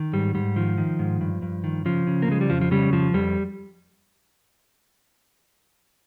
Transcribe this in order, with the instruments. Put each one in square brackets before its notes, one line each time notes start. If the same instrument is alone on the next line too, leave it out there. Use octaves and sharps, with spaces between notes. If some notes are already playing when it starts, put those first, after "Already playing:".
Already playing: [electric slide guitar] D#3
G#2 G3
G#2 G3
D#3 F3
D#3
G#2
G2
G2
D#3
C#3 F3
C#3
A#3
C#3 G#3
G3
F2 F3
F3
C#3 G3
F2 F3
F2 G3